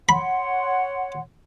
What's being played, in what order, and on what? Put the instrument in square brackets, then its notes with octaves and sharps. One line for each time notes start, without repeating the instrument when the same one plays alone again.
[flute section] C#5 F#5 C6 [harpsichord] B5